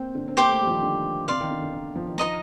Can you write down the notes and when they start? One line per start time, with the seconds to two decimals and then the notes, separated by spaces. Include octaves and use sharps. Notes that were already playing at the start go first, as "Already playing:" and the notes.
Already playing: A#3 C4 G5
0.15 D3
0.28 C4
0.37 A#3 G4 C5 G5 D6
0.49 A3
0.60 G3
0.67 F3
0.71 D#3
0.83 D3
1.27 C3 D5 F5 C6
1.41 D#3
1.50 D3
1.62 D3
1.73 D#3
1.95 F3
2.07 D#3
2.18 F3 D#4 A#4 D#5 A#5